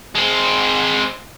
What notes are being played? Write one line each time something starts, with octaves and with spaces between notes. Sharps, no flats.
G#3 C4